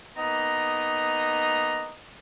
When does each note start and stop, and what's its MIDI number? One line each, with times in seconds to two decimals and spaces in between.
0.17 1.93 58
0.17 1.93 59
0.17 1.93 63
0.17 1.93 75
0.17 1.93 82